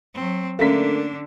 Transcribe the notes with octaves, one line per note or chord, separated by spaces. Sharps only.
F#3 C4
D3 A3 A#3 C#4 D4 F5 B6